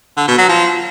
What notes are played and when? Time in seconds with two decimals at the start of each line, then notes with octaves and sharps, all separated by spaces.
0.17 D3
0.28 B2
0.38 F#3
0.49 F3